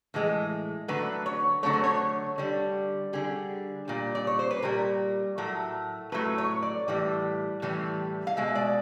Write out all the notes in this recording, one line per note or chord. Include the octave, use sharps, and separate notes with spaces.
A2 E3 G#3
D3 F#3 A3 B4
C#5
D3 F#3 A3 C#5
C5
C#5
D3 G3
D3 G3 G#4
A#2 G3
D5
C#5
C5
B4
A#2 G3 A#4
A2 F#3 A3
A2 F#3 A3 B4
C#5
D5
A2 E3 G3
A2 E3 G3
F5
B2 G#3 E5
D5